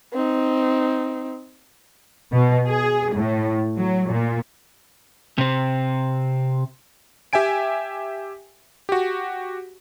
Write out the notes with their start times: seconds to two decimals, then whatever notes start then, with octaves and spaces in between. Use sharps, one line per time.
0.13 C4 D#4
2.32 B2
2.68 G#4
3.15 A2
3.77 F#3
4.08 A#2
5.38 C3 C4
7.33 G4 E5 G5 G#5 D7
8.89 F#4 G4